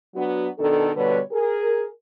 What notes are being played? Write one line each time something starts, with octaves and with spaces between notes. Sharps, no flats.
F#3 B3 D4 F#4
B2 D#3 D4 A4
B2 D3 G3 B4 C#5
G#4 A#4